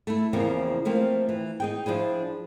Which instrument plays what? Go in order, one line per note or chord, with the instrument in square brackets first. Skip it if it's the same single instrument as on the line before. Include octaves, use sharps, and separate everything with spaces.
[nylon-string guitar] A3 E4
E2 C#3 F3 A#3 C4
F3 A3 A#3 C4 F4
E3
D#4 G#4 G5
F3 D4 E4 G#4